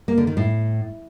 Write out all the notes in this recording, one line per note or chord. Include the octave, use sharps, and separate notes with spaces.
A#3
D3
D#3
A2